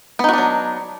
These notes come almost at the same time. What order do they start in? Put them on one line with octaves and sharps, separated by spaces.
B3 D#4 F#4 D4 F#3